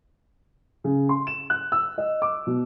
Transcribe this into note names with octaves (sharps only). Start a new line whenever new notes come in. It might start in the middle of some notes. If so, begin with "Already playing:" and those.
C#3
C6
E7
F#6
E6
D#5
D6
B2